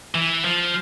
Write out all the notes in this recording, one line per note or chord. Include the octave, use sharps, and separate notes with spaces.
E3
F3